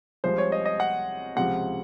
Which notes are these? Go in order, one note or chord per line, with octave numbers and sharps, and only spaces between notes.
C2 C3 F3 G#3 C5
C#5
D#5
D#5
F#5
C#2 C3 F3 F#5